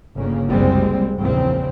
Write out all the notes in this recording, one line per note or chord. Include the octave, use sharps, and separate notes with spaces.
G1 C#3 A#3
F#1 C2 G3 G#3 C4
A#1 E2 C#3 C4